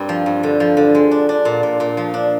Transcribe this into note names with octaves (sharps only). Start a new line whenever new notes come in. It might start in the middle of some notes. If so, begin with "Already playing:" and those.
Already playing: G2 C4 D4 A#4
F3
G2
D3
F3
D3
G#3
D4
D4
A#2
A#2
A#2
F3
D4